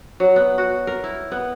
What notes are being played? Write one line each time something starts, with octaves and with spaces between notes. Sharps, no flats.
F#3
B3
F#4
A#4
E4
B3